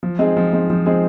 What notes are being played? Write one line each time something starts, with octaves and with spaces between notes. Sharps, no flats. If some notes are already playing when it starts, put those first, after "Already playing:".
F3
G#3 C4 D#4 G#4
F3
G#3 C4 D#4 G#4
F3
G#3 C4 D#4 G#4